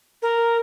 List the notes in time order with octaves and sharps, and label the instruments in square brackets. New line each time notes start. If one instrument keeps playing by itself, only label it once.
[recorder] A#4